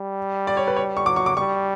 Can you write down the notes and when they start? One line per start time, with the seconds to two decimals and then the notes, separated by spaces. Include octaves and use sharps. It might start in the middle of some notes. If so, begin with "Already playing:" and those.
Already playing: G3
0.47 D5
0.57 C#5
0.68 B4
0.77 C#5
0.97 C#6
1.06 F#3 D6
1.16 C#6
1.26 D6
1.37 G3 C#6